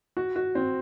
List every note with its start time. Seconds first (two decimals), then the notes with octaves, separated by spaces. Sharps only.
0.17 F#4
0.36 F#4
0.55 C4